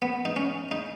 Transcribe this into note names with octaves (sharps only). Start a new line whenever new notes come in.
B3
D#4
C#4
D#4